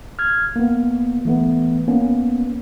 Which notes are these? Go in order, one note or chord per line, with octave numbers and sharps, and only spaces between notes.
F6 G#6
A#3 B3
E3 A3 B3
A#3 B3 C#4